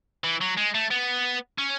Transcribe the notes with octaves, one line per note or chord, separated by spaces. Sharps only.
E3
F#3
G#3
A3
B3
C#4